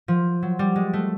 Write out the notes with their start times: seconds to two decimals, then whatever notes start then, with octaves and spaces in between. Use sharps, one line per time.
0.08 F3
0.42 F#3
0.59 G3
0.76 G#3
0.93 A3